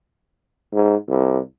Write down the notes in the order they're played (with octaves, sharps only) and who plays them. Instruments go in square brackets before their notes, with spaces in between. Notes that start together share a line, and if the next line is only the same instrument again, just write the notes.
[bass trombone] G#2
C2